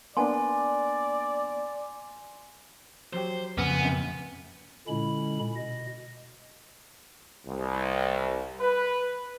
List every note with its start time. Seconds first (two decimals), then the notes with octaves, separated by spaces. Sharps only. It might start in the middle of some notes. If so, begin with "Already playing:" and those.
0.17 A#3 B3 D4 D5 G#5 C6
3.13 F#3 G4 C5
3.58 F2 A#2 C#3 B3 G#5 F6
3.80 F#2 C3
4.88 A#2 D3 G#3 C#4 E4 B5
5.56 B2 D#5
7.47 C2
8.60 B4